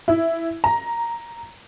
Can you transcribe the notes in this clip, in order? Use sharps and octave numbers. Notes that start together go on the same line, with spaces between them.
E4
A#5